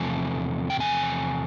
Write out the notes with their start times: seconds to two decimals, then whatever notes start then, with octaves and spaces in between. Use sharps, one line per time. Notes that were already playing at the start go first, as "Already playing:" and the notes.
Already playing: E2 C3 F3 A3 G#5
0.70 G5
0.80 G#5